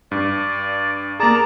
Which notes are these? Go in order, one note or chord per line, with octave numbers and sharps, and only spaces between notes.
G2 D5
A#3 G#4 D5 A5 A#5